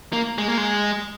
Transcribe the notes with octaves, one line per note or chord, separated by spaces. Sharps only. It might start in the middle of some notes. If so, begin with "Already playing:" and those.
A#3
G#3
A#3
G#3